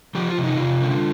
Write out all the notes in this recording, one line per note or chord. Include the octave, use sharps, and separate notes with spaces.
F3 G4
F4
C3
D#4
C3 F4
D3